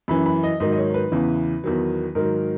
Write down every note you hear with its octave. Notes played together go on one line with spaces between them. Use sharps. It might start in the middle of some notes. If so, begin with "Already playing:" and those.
F#2 E3 B5
B5
D#5
G#2 D#3 F#3 D#5
D#5
C#5
B4
E2 C#3 E3
E2 D#3 F#3
G#2 D#3 F#3 A#4